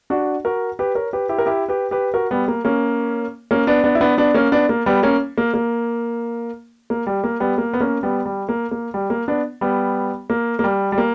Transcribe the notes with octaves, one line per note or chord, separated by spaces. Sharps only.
D4 F#4
F#4 A#4
G4 B4
A#4 C#5
G4 B4
E4 G4
A#4
E4 G4
G4 B4
G4 B4
F#4 A#4
G3 B3
A#3
A#3 C#4
A#3 C#4
B3 D4
B3 D4
E4
B3 D4
B3 D4
A#3 C#4
B3 D4
A#3
G3 B3
A#3 C#4
A#3
A#3
A#3
G3
A#3
G3 B3
A#3
B3
A#3 C#4
G3 B3
G3
A#3
A#3
G3
A#3
B3 D4
G3 B3
A#3
A#3
G3
G3
A#3